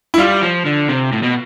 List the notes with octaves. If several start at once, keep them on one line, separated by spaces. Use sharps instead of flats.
E4
G3 F4
F3
D3
C3
A2
B2